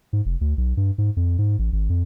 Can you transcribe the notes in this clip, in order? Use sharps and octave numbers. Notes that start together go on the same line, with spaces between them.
G#2
F1
D2
B1
G2
G#2
F2
G#2
A1
G#1
F2